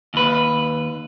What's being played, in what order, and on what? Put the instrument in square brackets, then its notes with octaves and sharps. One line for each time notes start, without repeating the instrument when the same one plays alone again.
[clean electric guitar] D#2 B4